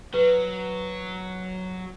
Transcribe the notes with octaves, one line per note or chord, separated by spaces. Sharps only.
F#3 B4